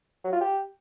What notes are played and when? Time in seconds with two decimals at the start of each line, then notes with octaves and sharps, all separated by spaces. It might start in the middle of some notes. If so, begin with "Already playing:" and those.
0.24 F#3
0.33 F4
0.41 G4